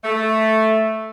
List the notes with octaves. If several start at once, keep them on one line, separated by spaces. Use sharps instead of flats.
A3